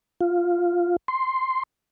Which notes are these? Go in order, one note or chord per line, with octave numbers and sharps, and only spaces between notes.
F4
C6